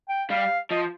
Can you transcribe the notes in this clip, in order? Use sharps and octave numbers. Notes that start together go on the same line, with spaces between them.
G5
G3 F5
F3 D#5